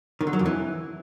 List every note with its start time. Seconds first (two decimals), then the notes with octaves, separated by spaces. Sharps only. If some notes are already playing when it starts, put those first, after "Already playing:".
0.21 D#3
0.27 D3
0.33 F#3
0.39 F2
0.46 E3